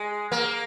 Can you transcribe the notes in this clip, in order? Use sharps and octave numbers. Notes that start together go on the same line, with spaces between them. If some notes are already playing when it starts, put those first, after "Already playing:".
Already playing: G#3
A#3